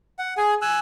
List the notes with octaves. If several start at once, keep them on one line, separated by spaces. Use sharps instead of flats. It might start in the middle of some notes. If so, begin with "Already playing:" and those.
F#5
G#4 G#5
G#5 E6 F#6